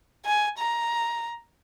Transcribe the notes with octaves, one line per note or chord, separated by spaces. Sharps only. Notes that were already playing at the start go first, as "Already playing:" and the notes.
G#5
A#5